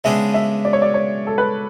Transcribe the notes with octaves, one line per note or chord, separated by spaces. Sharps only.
C#3 G#3 B3 D4 G#4 E5
E5
D5
C#5
D5
C#5
A4
B4